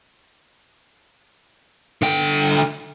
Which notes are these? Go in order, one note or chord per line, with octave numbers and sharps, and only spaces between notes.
D3 G5